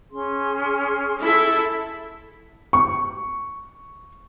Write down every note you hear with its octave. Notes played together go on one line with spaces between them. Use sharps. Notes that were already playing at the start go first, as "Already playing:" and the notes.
C#4 G#4 C6
E4 A4 E5
C#6